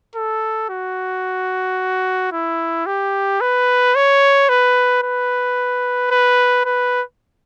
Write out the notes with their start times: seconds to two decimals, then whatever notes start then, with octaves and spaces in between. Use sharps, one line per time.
0.16 A4
0.70 F#4
2.32 E4
2.86 G4
3.41 B4
3.95 C#5
4.49 B4
5.03 B4
6.11 B4
6.65 B4